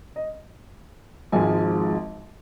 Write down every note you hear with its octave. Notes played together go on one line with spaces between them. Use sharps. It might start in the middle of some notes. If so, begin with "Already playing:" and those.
D#5
G#1 G#2 F3 G#3 G#5